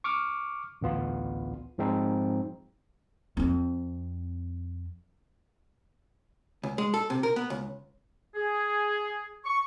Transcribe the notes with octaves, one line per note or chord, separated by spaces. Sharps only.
C#6 D6 F6
A1 D2 B3 F4
G#2 F3 G#3 C4 D#4
F2 C4
C#2
G#3
A4
C3
A#4
B3
C#2
G#4
C#6